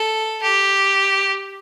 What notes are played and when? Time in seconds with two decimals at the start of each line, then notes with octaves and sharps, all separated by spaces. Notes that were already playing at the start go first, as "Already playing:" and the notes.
Already playing: A4
0.42 G4